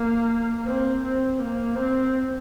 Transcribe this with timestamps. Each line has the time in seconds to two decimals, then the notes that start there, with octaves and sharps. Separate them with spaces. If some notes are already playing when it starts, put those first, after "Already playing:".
Already playing: A#3
0.66 C4
1.03 C4
1.39 A#3
1.76 C4